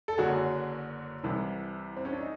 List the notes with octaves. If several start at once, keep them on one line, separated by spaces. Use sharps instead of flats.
A4
F#1 F#2 D3 F#4 G#4
C2 C3 E3
C4
C#4
D4
D#4